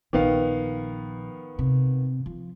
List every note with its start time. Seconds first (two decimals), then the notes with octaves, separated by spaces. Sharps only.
0.13 A#1 D#3 B3 F5
1.59 C3
2.26 F3